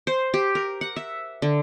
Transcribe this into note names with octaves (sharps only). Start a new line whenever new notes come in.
C5
G4
A#4
F#5
E5
D3